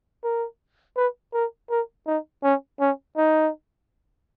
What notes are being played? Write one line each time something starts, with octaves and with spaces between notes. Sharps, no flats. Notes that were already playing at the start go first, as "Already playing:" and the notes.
A#4
B4
A#4
A#4
D#4
C#4
C#4
D#4